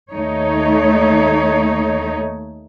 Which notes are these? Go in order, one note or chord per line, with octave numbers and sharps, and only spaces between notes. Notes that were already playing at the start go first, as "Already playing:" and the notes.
D#2 A3 D#4 C#5